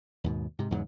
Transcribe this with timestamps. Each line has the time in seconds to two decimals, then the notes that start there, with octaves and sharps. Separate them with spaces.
0.24 D#2 G#2 B2
0.59 G#2 C3
0.71 E2 G#2 C#3 F#3